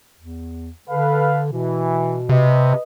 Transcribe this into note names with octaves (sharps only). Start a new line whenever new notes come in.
E2
D3 A4 B4 F5
B2 E3
C3 B4 D#5